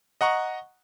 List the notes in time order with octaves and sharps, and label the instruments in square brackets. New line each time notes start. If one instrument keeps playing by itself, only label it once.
[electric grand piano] D#5 F#5 A#5 C#6